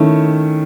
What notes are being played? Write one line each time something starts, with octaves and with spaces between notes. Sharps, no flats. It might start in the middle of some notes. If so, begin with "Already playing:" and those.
Already playing: D#3 A3 C#4 E4